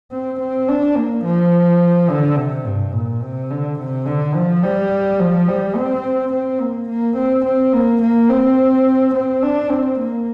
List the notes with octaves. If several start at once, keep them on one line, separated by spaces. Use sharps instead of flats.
C4
C4
D4
A#3
F3
D3
C3
G2
A#2
C3
D3
C3
D3
F3
G3
F3
G3
C4
C4
A#3
A#3
C4
C4
A#3
A#3
C4
C4
D4
C4
A#3